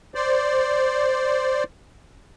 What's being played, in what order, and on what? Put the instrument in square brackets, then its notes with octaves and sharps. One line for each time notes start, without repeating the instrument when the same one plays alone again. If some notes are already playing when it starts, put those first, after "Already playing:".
[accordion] C5 D5